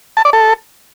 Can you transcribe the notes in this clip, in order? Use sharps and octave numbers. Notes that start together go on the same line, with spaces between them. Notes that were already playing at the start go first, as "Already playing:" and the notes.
A5
D5
A4